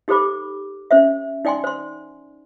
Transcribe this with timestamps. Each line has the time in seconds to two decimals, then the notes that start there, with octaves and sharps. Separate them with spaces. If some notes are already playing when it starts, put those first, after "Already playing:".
0.08 D#4 G4 A4 C5 B5 D6
0.91 C#4 C5 E5
1.45 D#4 D5 G5 G#5 C6
1.64 C5 C6